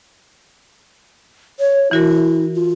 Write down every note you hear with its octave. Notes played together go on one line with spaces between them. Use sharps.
C#5
E3 E4 F#4 A#4
F4